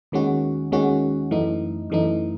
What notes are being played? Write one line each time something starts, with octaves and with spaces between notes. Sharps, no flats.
D#2 D#3 G#3 C#4 F#4
D#2 D#3 G#3 C#4 F#4
F#2 E3 A3 D#4
F#2 E3 A3 D#4